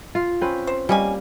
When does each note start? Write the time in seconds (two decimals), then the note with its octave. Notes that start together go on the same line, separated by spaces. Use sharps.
0.15 F4
0.41 C4 C#4 B4
0.67 C5
0.89 G3 A#3 C#4 D#5 G#5